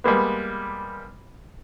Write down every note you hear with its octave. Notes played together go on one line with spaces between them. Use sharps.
G3 G#3 A#3 B3